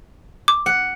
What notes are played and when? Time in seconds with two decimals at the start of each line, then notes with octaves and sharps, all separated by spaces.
0.48 D6
0.66 F#5